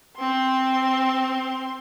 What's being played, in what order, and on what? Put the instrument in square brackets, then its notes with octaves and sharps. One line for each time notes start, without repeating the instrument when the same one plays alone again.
[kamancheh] C4 C6